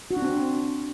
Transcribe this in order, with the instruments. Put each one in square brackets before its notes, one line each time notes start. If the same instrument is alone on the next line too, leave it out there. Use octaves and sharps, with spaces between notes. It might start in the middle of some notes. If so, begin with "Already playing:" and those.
[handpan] F#4
D4
C4